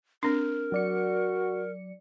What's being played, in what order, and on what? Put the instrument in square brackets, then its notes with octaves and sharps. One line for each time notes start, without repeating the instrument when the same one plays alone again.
[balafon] C4 D4 [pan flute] A#4
[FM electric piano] F#3 D5 C#7 [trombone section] F#4